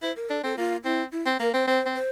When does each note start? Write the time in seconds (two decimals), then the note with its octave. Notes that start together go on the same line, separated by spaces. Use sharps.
0.02 E4 C5
0.16 A#4
0.29 D4 A4
0.44 C4 A4
0.57 A#3 F4
0.84 C4 E4
1.12 E4
1.26 C4
1.40 A#3 A#4
1.54 C4 C5
1.67 C4 C5
1.86 C4
1.95 C5